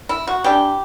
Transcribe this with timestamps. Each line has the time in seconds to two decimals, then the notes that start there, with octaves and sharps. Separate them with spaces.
0.09 E4
0.27 F#4
0.44 E3 G3 D4 G4